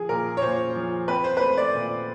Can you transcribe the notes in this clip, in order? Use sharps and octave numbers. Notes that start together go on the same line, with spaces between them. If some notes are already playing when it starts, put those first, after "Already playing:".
Already playing: F3 G#4
A#2 A#4
C#5
A#2 C5
F3
C4 B4
C5
B4
A3 C5
D5
A#2